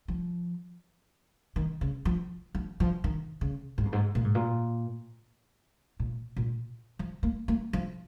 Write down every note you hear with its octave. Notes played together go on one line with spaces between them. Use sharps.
F3
D#3
C#3
F3
F3
F3
D#3
C#3
G#2
F2
G#2
A#2
G#2
A#2
A#2
A#2
F3
A#3
A#3
F3